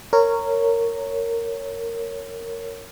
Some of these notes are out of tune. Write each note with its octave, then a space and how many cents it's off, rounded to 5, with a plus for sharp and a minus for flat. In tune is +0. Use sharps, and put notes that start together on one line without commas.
A#4 -15 C#5 +0